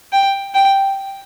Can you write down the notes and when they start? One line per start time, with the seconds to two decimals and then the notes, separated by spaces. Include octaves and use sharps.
0.12 G5
0.54 G5